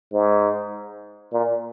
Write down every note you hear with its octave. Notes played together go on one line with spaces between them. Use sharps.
G#2
A#2